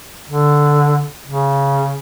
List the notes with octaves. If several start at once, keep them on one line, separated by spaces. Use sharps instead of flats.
D3
C#3